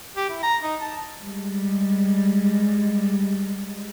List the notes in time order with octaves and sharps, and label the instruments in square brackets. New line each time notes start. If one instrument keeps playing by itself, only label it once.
[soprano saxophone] G4
E4
A#5
D#4
A5
[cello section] G3 G#3